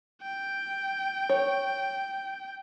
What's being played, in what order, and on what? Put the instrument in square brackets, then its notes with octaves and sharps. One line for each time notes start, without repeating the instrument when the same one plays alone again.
[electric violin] G5
[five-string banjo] C#5